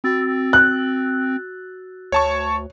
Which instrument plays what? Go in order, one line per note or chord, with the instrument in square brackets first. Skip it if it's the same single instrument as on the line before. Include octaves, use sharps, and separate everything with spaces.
[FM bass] C4 [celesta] F#4 E6 A6
[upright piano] F#6
[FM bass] D2 [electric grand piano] C#5 A5 C#6